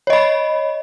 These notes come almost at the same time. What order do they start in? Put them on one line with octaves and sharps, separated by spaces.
C#5 D#5 B5